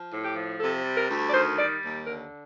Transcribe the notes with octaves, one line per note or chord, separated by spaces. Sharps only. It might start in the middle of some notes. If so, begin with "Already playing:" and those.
Already playing: F3
A2
G4
F3
C3 A4
G3
A#4
D2
D5
D#3 C5
G3 D5
D#2
D3 A#4